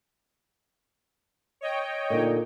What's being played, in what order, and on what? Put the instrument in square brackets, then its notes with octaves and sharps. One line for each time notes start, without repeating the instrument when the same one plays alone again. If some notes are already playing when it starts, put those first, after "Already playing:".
[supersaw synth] C#5 D#5 G5
[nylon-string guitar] A#2 D3 D#4